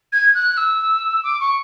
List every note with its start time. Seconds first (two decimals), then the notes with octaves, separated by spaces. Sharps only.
0.12 G#6
0.34 F#6
0.57 E6
1.23 D6
1.40 C#6